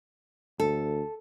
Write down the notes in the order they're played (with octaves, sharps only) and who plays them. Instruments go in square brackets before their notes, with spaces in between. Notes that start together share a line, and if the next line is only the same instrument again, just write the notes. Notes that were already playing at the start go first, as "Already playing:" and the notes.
[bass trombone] D2 [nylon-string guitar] A4